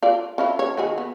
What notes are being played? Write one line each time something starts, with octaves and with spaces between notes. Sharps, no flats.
F4 D5
C#4 E4 F4
C#5
D#3 F#4 G#4
B3